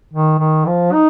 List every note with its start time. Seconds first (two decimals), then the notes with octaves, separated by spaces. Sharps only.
0.14 D#3
0.40 D#3
0.66 F3
0.93 D#4